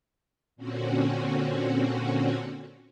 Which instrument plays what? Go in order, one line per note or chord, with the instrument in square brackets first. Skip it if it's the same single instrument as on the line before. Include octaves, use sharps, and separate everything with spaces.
[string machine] A#2 D3 C4 C#4 F#4